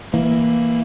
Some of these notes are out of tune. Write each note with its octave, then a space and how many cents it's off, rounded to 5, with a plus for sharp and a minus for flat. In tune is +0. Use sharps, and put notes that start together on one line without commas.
E3 +0 A#3 +0